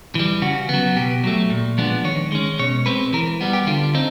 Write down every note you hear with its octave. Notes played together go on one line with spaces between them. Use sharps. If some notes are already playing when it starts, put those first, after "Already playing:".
E3 G3
C#3 F#4
F#3 B3
B2 G4
F#3 A3
A#2
F3 G#3 B3 D4
D#3 C#5
G#3 C#4
B2 C#5
G#3 C4 B4
E3 A#4
G3 B3
G4
D3 F4
C4 D#4